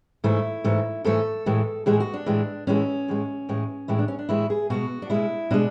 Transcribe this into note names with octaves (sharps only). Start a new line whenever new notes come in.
G#2 E3 A3 E4
G#2 E3 A3
G#2 E3 A3 A4
A2 E3 G#3
A2 E3 G#3 G#4
F#4
D4
A2 E3 G#3
A2 E3 G#3 C#4
A2 E3 G#3
A2 E3 G#3
A2 E3 G#3 E4
D4
C#4
D4
A2 E3 G#3 E4
G#4
B2 G#3 F#4
D4
B2 G#3 E4
B2 G#3 D4